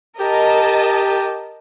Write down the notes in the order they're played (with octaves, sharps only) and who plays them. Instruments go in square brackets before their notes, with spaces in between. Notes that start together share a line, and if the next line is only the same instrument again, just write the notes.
[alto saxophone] G4 [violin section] A#4 D#5 A5